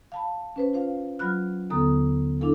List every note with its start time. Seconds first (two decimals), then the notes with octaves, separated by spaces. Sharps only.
0.12 F5 A5 B5
0.56 C#4 B4 C5
0.73 F4 C5 F5
1.19 F#3 F4 B5 F6 F#6
1.70 D#2 D3 B3 A4 A#5 D#6
2.41 D4 E4 A4 F5